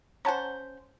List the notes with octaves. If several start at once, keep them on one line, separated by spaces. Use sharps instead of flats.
C#4 C5 F#5 A5 A#5